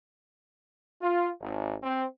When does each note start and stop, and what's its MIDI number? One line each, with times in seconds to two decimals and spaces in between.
1.01 1.29 65
1.41 1.74 32
1.82 2.04 60